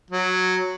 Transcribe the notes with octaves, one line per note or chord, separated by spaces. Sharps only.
F#3